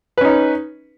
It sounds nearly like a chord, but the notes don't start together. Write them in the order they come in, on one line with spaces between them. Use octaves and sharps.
B4 C#4 D#4